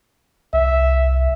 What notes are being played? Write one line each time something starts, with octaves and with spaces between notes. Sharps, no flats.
C2 E5